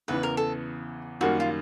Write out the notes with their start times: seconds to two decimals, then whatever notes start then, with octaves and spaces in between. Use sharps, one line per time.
0.08 E2 C#3 E3 B4
0.23 A#4
0.37 A4
1.21 F#2 D#3 G3 A#3 F#4
1.40 F4